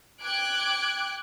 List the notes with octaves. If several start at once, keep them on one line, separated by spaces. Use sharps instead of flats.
G5 D6 F#6 G#6 D7